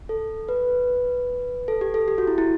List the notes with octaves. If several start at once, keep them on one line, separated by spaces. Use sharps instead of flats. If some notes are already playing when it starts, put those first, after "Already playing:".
A4
B4
A4
G4
A4
G4
F#4
E4
E4